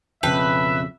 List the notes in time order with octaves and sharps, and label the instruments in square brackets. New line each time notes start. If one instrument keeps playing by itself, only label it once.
[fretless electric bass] B1 F2 C#3 [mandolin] B4 [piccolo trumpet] E5 [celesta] G5 A5 G6